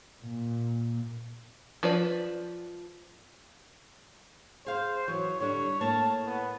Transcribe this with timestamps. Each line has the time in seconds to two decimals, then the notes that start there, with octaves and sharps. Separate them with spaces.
0.20 A#2
1.83 F3 B4 D5
4.66 G#4 C5 F5
5.08 E3 F#3 C#5
5.40 D3 G3 D4 C#5
5.81 A2 A#3 C#5 A5
6.26 B3